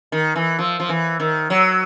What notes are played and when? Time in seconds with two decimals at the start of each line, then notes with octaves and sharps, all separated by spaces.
0.12 D#3
0.36 E3
0.59 F3
0.80 F3
0.89 E3
1.20 D#3
1.50 F#3